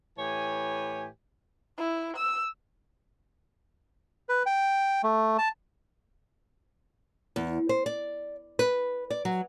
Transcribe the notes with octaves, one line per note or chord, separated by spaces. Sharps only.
A2 E3 G4 C#5 G#5
E4
E6
B4
G5
A3
A5
E2
C5
D5
B4
D5
F#3